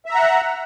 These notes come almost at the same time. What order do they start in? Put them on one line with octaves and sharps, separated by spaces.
E5 A#5 F#5